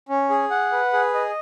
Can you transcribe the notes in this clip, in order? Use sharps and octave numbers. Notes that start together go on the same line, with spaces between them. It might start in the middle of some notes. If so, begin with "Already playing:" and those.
C#4
G#4
F#5
B4
G#4
D#5